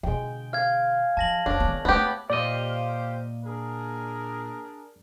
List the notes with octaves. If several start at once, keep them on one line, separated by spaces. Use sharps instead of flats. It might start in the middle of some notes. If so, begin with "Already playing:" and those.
B2 D3 G#3 G5
F5 F6 G#6
F3 A5 A#6 F#7
F1 D4 C#5
D#3 B3
A3 B3 C4 G4 B4
A#2 G4 C5 D5 D#5 F5
D4 G#4 A#4